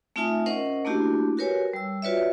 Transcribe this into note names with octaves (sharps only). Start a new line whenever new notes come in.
A3 C4 D#4 F4 E5 G#5
C#4 A#4 C5 D#5 F#5
A3 A#3 D4 E4 F#4 G4
F#4 G4 A#4 B4 C#5 G#5
G3 E6
F4 F#4 B4 C#5 D5 E5